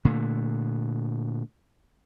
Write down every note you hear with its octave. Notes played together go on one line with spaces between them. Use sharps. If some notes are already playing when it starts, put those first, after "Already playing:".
A#2 D3 A3